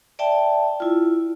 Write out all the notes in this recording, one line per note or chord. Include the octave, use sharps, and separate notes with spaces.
D5 E5 G5 A5
E4 F4